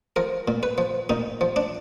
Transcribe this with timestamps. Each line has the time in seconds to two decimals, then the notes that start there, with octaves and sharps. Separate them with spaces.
0.16 F3 A#4
0.48 A#2
0.63 B4
0.78 F3
1.09 A#2 D#4
1.41 F3
1.56 D4